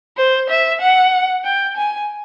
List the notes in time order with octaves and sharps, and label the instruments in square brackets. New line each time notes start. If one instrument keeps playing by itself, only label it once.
[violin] C5
E5
F#5
G5
G#5